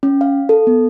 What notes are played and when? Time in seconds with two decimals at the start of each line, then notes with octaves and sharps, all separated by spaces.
0.03 C#4
0.21 F5
0.49 A4
0.67 B3